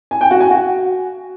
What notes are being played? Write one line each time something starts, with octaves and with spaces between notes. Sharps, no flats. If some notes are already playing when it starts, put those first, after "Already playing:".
G#5
G5
F#4
G#5
F#4